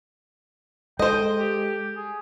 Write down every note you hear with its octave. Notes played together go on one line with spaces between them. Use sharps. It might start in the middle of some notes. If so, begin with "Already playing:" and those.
G#3 A4 C5 D#5 G5
G4
G#4